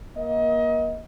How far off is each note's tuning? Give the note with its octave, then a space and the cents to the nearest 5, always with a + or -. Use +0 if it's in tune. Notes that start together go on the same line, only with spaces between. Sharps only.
A#3 +30 D#5 +30